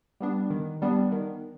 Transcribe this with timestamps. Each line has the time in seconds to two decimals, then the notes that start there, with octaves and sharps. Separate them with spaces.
0.20 G3 B3 D4
0.50 D#3
0.82 G3 B3 D4
1.12 D#3